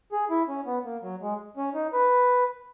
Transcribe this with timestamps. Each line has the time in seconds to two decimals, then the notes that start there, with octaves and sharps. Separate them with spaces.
0.12 G#4
0.30 E4
0.48 C#4
0.66 B3
0.85 A#3
1.03 F#3
1.21 G#3
1.57 C#4
1.75 D#4
1.93 B4